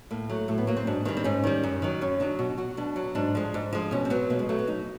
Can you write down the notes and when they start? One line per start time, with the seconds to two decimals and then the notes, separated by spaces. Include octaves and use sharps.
0.11 A2 A#3
0.29 F#3 A3
0.48 A2 A3
0.58 B3
0.67 F#3 A#3
0.77 C4
0.87 G#2 D4
1.05 D#3 C4
1.08 G3
1.17 C4
1.24 G#2 C#4
1.44 D#3 G3
1.63 F#2
1.82 D#3 F#3
2.01 F#2 C#4
2.20 D#3 F#3 D4
2.39 B2 F#4
2.58 F#3 F#4
2.77 B2 D4
2.96 F#3
3.15 G#2 D4
3.35 F3 G#3
3.54 G#2
3.73 F3 G#3
3.91 B2 C#4
4.05 C4
4.10 F#3 B3
4.30 B2 A#3
4.39 G#3
4.49 F#3 A3
4.59 B3
4.67 B2 D#4